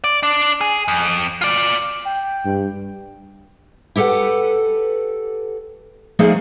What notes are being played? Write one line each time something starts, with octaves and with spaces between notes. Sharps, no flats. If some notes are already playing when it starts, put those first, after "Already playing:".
D5
D4
G#4
F2
F4 D5
G5
G2
E4 G4 A4 B4 F#5
F3 A3 A#3 D#4 G#4